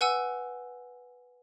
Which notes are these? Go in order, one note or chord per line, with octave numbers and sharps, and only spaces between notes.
B4 F#5 G#5 E6